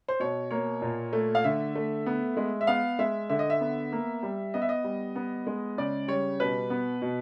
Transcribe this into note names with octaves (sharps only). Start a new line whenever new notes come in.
C5
B2 C#5
A#3 C#5
A#2
A3
F5
D3 E5
A3
B3
G#3
E5
B3 F5
G#3 E5
D3 E5
D#5
E5
B3
A#3
G3
B3 D#5
E5
D#5
G3
B3
G#3
C#3 D5
G3 C#5
B2 B4
B3
B2